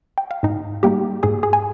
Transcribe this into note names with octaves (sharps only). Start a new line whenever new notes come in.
G5
F5
G#2 D#4 D#5
G3 A#3 D#4 G4 G5
G#2 G#4 G#5
G#4 G#5
G#5